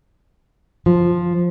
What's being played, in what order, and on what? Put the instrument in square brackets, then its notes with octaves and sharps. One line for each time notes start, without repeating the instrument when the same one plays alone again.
[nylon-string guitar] F3